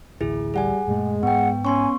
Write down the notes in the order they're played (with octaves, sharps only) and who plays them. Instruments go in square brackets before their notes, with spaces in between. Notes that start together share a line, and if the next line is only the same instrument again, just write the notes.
[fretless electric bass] A1 D2 [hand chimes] E4 G#4
[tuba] G3 [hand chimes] G#4 F#5 G#5
[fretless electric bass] F#2 A#2 A3 [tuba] G#3
[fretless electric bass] G#2 [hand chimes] B3 G5 [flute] F#5
[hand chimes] B3 C6 C#6 [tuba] C#4 [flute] G#5